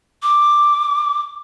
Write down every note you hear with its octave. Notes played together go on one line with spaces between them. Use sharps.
D6